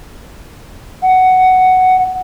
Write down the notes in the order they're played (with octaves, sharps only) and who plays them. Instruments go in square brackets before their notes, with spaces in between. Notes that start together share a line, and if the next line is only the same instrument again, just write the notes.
[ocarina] F#5